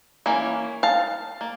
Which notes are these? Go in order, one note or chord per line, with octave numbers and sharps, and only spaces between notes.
E3 A#3 C#4
F5 A5
A#3